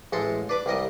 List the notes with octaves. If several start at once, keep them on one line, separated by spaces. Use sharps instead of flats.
A1 G#3 A4 C6
D4 B4 D6
C2 G3 A#4 D#5